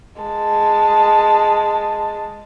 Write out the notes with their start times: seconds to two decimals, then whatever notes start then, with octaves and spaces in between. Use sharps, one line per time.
0.22 G#3 A5